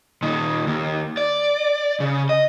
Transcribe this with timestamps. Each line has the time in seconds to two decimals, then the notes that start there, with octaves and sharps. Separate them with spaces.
0.23 A#2 D#3
0.67 D#2
1.17 D5
2.00 C#3
2.29 D#5